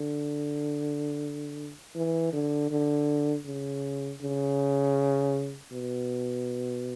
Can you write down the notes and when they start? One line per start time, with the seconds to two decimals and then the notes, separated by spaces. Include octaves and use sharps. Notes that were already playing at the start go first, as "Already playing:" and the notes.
Already playing: D3
1.95 E3
2.33 D3
2.70 D3
3.46 C#3
4.21 C#3
5.71 B2